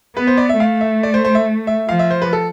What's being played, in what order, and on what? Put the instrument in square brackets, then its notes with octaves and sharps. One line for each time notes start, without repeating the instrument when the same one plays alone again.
[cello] B3 [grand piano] B4
[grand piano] C5
D5
E5
[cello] A3 [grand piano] F5
[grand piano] E5
D5
C5
C5
E5
E5
[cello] F3 [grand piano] F5
[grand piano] E5
C5
B4
A4